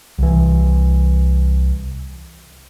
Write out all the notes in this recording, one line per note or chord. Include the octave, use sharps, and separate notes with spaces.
C2 E3